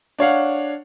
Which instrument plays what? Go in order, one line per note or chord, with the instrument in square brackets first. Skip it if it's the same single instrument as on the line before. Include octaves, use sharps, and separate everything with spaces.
[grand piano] D4 C#5 F5 F#5